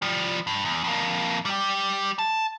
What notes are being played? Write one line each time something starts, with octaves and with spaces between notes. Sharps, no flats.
F3 G3
G2
E2
F2 A#3
G3 G4
A5